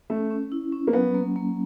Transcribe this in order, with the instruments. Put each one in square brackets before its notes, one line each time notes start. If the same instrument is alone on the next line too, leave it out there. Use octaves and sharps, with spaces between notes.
[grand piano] A3 [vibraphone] C#4
[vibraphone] C#4
E4
C#4
[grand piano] A#3
[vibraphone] F#3 [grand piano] B3
[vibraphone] A#3
A#3